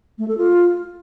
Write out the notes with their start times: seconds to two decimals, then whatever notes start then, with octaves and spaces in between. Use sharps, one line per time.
0.18 A3
0.28 A4
0.38 F4